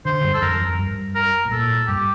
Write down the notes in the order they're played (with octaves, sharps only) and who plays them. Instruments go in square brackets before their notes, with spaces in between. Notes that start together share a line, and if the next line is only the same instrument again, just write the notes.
[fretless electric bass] D3 [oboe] C5
[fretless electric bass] G2
[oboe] A4
[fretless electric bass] F2 [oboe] A#4
[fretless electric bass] F2
G2
[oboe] A#4
[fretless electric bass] A2
[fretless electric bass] A#2 [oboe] A4
[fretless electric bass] G2 [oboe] G4